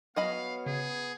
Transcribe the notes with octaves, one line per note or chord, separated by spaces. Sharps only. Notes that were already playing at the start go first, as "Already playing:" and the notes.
F#3 B3 D#5 F5 B5
C#3 G#4